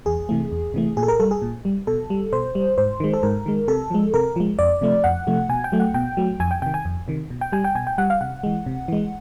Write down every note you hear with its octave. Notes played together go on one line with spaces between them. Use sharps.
E2 G#4
C3 E3 A3
E2
C3 E3 A3
A#2 G#4
A4
A#4
G3 A4
G#4
A#2
G3
B2 A4
G3
B2 C5
G3
G#2 C5
D#3 G#3
A4
G#2 A#4
D#3 G#3
C3 A4
F3 G#3
C3 A#4
F3 G#3
F2 D5
C3 F3 A3
F2 F#5
C3 F3 A3
B2 G#5
G5
F#3 A3
F#5
B2 G5
F#3 A3
F2 G#5
G5
C3 D#3 G5
G#5
F2
C3 D#3
B2
G5
G3 G#5
G5
B2 G#5
G5
G3 F#5
F5
C3 F#5
E3 G#3
C3
E3 G#3